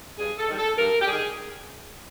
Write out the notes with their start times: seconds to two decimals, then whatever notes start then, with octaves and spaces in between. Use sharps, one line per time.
0.19 G2 G#4
0.38 A4
0.48 D#3 G3
0.58 A4
0.77 G2 A#4
1.01 G4
1.06 D#3 G3 G#4